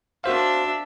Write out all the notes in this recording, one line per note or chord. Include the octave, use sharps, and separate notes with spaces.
D4 F#4 C5 E5 F5